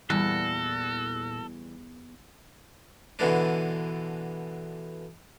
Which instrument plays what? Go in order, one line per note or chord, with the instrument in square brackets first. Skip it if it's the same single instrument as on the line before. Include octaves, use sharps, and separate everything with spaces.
[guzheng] E2 [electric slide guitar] A#2 F#4 [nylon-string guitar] E3 G3 [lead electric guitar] A4
[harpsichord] B2 D3 E3 G#3 D4